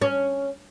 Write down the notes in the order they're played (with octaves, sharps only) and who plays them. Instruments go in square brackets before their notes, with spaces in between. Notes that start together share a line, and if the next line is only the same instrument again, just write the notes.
[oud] C#4